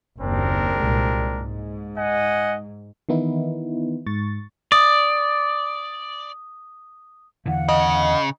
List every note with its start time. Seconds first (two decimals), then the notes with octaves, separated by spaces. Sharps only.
0.20 F#1 D#2 C4 D4 A#4
0.77 C2 A#2 G#3
1.36 G#2
1.97 D#5 F#5 G#5
3.09 D#3 E3 B3 D#4 E4
4.06 G#2 C#6 A6
4.72 D5 D#6
7.46 E2 D3 E3 F5 F#5
7.69 C#3 D#5